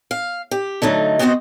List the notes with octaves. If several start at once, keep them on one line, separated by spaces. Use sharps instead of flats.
F5
G4
D3 F#3 A3 D#4
B3 C4 E4 F#4 C5 D#5